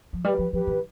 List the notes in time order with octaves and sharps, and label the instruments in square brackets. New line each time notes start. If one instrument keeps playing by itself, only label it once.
[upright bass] F3
[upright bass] G3 [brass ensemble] G4 B4
[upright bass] F3
[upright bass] F3 [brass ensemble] G4 B4
[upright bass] E3